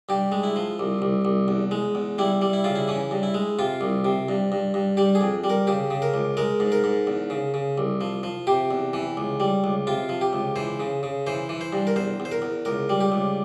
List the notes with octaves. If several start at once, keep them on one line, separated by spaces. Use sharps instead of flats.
G2 G4
G#3
E4
F3
C2
C2
C2
E2
G#3
E2
G3 E4
G3
E4
C#3 F4
E4
E3 C#4
G2
E4
G#3
C3 F4
C2
C3
G2
G2
G2
G3 G4
G#4
F2
G3
A#4
C#3 G4
C#3
A#4
C#2
G#3 A#4
G#2
A#4
G#2
E2
C#3
C#3
C2
F3
F3
C3 G4
E2
E3
C#2
G3
C#2
C3 F4
F3
G4
C#2
E3 C5
C#3
C#3
E3 C5
E3
C5
G2
A#4
E2 C5
E2
C5
A#4
E2
C#2 A#4
G3
G4
C#2